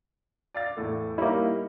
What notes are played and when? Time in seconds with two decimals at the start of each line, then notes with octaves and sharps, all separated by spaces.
0.55 D5 F5 A6
0.77 E2 A2 A4
1.18 G3 A#3 D#4 E4 C#5